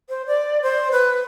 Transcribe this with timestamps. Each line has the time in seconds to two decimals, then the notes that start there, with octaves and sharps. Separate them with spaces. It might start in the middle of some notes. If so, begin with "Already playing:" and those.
0.09 C5
0.27 D5
0.62 C5
0.92 B4